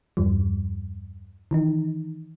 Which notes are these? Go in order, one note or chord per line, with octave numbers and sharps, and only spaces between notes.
E2 G2 F3 G3
D#3 E3 D#4